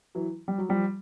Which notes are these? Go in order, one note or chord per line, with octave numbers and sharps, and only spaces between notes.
E3 F#3
G3
F#3
F3 G3